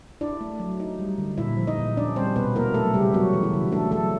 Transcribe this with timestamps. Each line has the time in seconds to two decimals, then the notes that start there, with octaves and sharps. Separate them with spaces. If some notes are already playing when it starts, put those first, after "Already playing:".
0.21 D4 E4 D5
0.41 A3
0.60 F#3
0.80 D#4
1.00 G3
1.18 D3
1.38 A#2 E4 E5
1.57 F3
1.67 D#4 D#5
1.78 A#2
1.97 C#4 D4 D5
2.16 G3 C4 C5
2.36 B2 B3 B4
2.55 A#3 E4 A#4
2.74 F#3 A3 A4
2.94 C#3 G3 G4
3.13 F#3 B3 F#4
3.33 E3
3.43 E4
3.53 C#3
3.72 A3 D4 A4
3.91 F#3 A3 A4